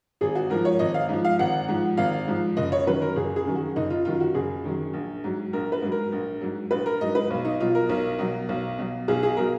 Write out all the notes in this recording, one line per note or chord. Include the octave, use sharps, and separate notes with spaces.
G#1 G#4
F#4
G#2 F3 A#4
C#5
G#1 D#5
F5
G#2 F3
F5
G#1 F#5
G#2 F3
G#1 F5
G#2 F3
F#1 D#5
C#5
F#2 D#3 F#3 B4
A#4
F#1 G#4
G#4
F#2 D#3 F#3
F#4
F#1 D#4
F4
F#2 D#3 F#3 F4
F#4
F#1 G#4
F#2 D#3 F#3
A#1
G#2 F#3
A#1 A#4
B4
G#2 F#3
A#4
A#1
G#2 F#3
A#1 B4
A#4
G#2 F#3 D#5
B4
B1
D#4
B2 F#3 F4
A#4
B1
B2 F#3
B1
B2 F#3
B1 G#4
G#4
B2 F#3 A#4